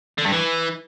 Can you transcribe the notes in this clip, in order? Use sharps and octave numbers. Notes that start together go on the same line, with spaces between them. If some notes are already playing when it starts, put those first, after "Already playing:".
D3
G2
E3